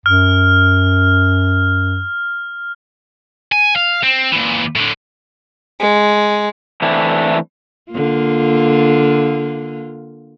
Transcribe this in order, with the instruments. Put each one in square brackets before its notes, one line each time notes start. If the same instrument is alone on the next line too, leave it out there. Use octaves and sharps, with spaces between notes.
[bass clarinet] F#2 [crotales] F6
[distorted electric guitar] G#5
F5
C4
A#2 E3
A2 D3
[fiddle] G#3
[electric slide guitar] E3 A3 C4 D4 E4
[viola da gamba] D3 A#3 F4